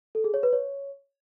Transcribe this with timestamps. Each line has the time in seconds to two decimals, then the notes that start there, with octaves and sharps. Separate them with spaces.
0.15 A4
0.24 G#4
0.34 C#5
0.43 B4
0.53 C#5